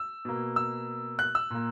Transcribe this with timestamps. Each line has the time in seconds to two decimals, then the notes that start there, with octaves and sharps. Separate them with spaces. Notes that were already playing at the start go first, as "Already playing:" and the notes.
Already playing: E6
0.25 B2 A#3
0.56 E6
1.19 F#6
1.35 E6
1.50 A#2 A#3